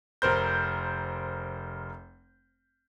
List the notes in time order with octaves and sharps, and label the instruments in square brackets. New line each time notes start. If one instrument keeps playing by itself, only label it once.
[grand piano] F1 A#4 C5 G6